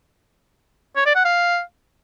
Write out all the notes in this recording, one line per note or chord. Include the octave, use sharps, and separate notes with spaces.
C#5
D5
F#5
F5